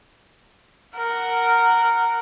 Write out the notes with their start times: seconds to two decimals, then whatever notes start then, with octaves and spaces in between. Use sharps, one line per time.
0.96 A#4 F#5